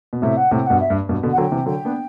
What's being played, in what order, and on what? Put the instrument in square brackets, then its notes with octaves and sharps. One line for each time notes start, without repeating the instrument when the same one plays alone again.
[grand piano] B2
[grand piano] A2 C3 [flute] E5
[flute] F#5
[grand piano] A2 C3 [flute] G5
[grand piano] G2 B2 [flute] F#5
[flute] E5
[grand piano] G2
G2 B2
B2 D3
[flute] F#5
[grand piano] D3 F#3 [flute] G5
[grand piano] C3 E3
[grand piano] D3 F#3 [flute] G5
[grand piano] B3 D4